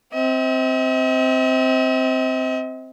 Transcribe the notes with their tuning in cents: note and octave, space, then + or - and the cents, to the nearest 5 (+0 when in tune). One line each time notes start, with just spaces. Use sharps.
C4 +0 D#5 +45